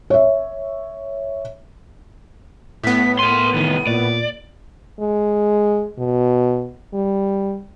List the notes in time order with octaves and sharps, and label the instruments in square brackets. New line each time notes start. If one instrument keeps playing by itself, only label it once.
[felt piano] C#5 E5
[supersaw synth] A2 B3 [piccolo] B6
[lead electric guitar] A#4 C6 [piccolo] D#7
[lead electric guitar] C3 E3 [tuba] D#3
[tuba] A#2 [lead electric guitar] D5
[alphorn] G#3
B2
G3